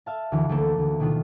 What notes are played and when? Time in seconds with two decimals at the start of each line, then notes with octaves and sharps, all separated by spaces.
0.06 E5 F5 A5
0.32 D2 E3
0.49 D2 E3 A3 A#3 A4
0.78 D2
1.00 B2 D#3 D4 F4